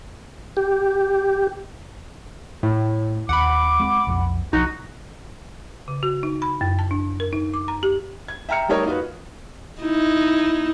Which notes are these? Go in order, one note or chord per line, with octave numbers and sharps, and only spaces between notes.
G4
A2
D#2 F#5 B5 D6
G#3 C4
B1 F2
B1 F3 D#4 F#4
C#3
F#4
D#4
B5
F#2
A5
D4
A#4
D#4
D6
A#5
G4
G#6
E5 G5 A#5 F6 C#7
G3 A3 D#4 A#4 C#5 D#5
D#4 F4 F#4 B4
D#4 E4